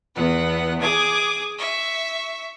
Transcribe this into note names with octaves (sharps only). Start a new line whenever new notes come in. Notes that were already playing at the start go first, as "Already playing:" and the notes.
E2 B3 B4 F#5
G#4 D6 D#6 G#6
E5 C#6